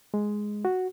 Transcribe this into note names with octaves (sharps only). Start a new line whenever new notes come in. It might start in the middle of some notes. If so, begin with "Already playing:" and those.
G#3
F#4